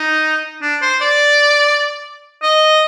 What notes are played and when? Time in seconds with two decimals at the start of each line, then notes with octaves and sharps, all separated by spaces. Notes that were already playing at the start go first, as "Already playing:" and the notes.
Already playing: D#4
0.62 D4
0.81 C5
1.01 D5
2.43 D#5